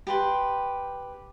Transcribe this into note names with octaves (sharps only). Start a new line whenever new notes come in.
G4 B4 C6